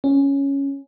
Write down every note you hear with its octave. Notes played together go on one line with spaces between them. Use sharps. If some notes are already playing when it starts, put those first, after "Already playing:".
C#4